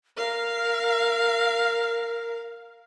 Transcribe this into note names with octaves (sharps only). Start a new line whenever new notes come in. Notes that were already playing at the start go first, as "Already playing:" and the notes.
A#4 F5